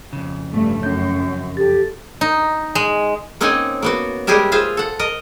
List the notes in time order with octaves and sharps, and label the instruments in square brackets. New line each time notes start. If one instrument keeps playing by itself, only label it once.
[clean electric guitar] F2 C#3
[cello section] G2 A3
[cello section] F#2 [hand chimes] C#4 G6
[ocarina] G4 [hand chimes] A4 A6
[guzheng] D#4
G#3
[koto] A#3 C4 C#4 D#4 F#5 G#5
A#3 B3 F#4
G3 G#3 G4 G#4 A#4 E5
F4 G#4 C5 E5 F5
A4 F#5
A#4 D#5